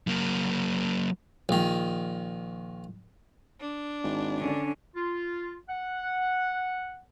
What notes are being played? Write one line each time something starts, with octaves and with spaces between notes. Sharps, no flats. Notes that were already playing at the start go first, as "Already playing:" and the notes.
F#3 A#3
A#1 D#3
D4
G#1
D3 C#4
F4
F#5